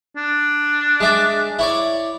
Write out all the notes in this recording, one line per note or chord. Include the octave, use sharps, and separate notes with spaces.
D4
G#3 E5 D6
E4 C#5 D5